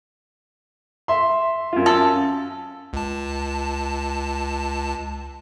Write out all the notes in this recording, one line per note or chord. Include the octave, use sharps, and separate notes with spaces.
E5 C6
F#2 F4
A4
C#2 A5